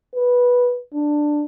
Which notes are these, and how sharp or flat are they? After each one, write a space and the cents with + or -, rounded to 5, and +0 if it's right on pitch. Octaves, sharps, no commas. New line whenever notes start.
B4 -10
D4 +10